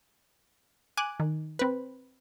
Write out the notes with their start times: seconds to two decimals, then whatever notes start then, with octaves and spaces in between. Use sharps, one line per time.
0.97 G#5 D6 F#6 D#7
1.20 D#3
1.59 C4 B4